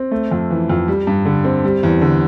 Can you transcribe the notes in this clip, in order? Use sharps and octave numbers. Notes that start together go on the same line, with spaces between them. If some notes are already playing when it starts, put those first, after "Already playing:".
Already playing: C4
A3
F2
E3
F2
G3
G2
D3
C4
G3
E2
D3